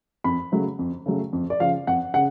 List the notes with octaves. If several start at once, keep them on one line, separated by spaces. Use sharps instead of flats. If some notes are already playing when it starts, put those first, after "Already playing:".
F2 B5
C#3 F#3 A3
F2
C#3 F#3 A3
F2
D5
C#3 F3 F5
F2 F#5
C#3 F#5